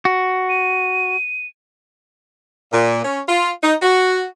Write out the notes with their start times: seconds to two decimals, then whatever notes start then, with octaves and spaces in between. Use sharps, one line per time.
0.05 F#4
0.49 D#7
2.72 A#2
3.04 C#4
3.28 F4
3.62 D#4
3.82 F#4